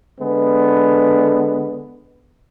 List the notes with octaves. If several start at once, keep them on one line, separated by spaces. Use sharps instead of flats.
D3 G#3 B3